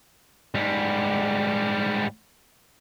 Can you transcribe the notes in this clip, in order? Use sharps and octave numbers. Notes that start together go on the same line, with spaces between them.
G#2 G3